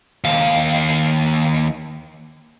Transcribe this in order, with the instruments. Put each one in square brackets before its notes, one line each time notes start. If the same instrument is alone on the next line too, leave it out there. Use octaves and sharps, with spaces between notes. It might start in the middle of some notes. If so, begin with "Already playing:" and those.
[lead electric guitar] D#2 F5